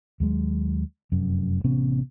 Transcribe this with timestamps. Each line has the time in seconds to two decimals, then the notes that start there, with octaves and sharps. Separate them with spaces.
0.20 D#2 F#3 G#3
1.12 F1 F#2
1.64 A1 C3 B3 C#4